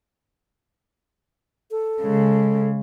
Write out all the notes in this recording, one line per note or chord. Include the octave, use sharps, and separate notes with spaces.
A4
C#3 G#3